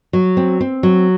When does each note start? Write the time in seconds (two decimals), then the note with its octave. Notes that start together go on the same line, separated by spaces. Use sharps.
0.13 F#3
0.37 C4
0.61 C4
0.83 F#3